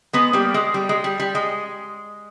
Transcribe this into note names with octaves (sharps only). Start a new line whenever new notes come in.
G#3 B3
G3 A#3
G#3
G3
G#3
G3
G3
G#3